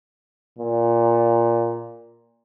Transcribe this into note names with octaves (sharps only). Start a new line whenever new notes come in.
A#2